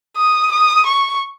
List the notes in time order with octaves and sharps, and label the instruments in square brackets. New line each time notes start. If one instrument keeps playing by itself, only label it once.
[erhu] D#6
D#6
C#6